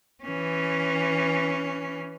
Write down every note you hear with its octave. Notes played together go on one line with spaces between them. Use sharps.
E3 C#4